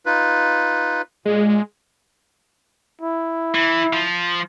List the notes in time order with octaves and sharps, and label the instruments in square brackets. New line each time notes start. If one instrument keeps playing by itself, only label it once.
[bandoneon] D#4 F4 B4
[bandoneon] A#2 [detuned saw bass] G#3
[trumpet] E4
[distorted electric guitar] E3
F3